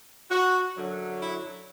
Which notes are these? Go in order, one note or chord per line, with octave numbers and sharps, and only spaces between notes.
F#4
F#2 D3 F#3
E4